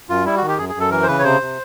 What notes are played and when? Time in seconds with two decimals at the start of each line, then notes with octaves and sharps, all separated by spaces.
0.09 F#2 F4
0.25 G3 E4
0.37 F#4
0.42 D#3
0.48 G4
0.58 F#2 G#4
0.69 G#4
0.75 F#2
0.80 A4
0.90 E3 A#4
1.02 C5
1.08 C#3 B4
1.19 C#5
1.23 C3 C5
1.41 C3